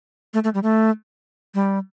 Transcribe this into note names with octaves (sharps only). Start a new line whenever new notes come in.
A3
A3
G3
A3
G3